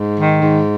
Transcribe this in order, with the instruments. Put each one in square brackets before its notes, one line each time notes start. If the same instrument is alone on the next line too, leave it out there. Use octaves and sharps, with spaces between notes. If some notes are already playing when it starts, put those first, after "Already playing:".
Already playing: [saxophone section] G#2
D#3
G#2